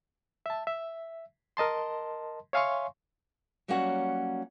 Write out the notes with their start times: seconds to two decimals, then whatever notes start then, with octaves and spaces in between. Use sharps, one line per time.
0.46 E5 A5
0.67 E5
1.57 A#4 D#5 A5 C6
2.53 C#5 E5 F5 G#5 C6 C#6
3.68 F#3 G3 A#3 C#4 F#4 F#5